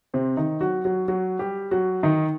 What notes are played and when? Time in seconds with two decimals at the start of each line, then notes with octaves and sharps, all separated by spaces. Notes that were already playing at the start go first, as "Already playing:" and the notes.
0.14 C3 C4
0.37 D#3 D#4
0.61 F#3 F#4
0.85 F#3 F#4
1.08 F#3 F#4
1.39 G3 G4
1.71 F#3 F#4
2.03 D#3 D#4